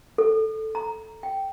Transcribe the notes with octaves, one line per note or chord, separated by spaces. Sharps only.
A4
A#5
G5